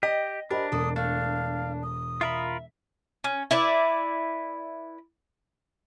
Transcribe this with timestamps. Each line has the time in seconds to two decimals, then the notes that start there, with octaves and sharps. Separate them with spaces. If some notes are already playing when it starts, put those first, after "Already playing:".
0.03 G4 D#5 G5
0.51 D4 G4 A#4 C5 D#5 B5
0.72 E1 A#3 A4 D#6
0.96 A3 D4 F5
1.83 D#6
2.21 F4 A#4 E5 B5
3.24 C#4
3.51 E4 B4 D5